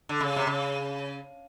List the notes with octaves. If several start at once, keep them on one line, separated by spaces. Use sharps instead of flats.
D3
C#3
C3
C#3